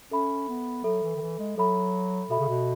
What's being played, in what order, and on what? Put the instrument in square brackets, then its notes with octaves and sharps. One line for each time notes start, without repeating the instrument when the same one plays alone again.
[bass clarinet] C#4 [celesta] A4 E5 B5
[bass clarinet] B3
[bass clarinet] F#3 [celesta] A4 E5 B5
[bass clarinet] E3
D#3
E3
G#3
[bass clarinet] F#3 [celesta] A4 E5 B5
[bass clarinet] B2 [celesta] A4 E5 B5
[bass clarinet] C#3
B2